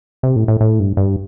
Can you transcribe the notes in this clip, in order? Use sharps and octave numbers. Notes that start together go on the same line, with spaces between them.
C3
A2
A2
A2
G2
G2